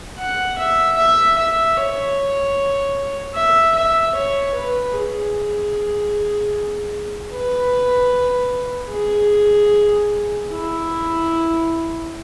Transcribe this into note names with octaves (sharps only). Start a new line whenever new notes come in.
F#5
E5
E5
E5
C#5
E5
E5
C#5
B4
G#4
B4
G#4
E4